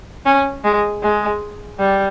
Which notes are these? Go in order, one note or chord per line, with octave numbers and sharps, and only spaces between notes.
C#4
G#3
G#3
G3